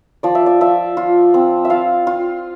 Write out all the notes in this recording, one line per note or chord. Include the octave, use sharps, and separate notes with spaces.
F3 D5
E5
D5
F3 E5
F4
C4
E5
F4 F5
F4